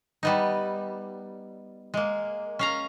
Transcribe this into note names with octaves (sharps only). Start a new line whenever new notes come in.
G3 B3 D#4
G#3 A#3
C#4 F5 A#5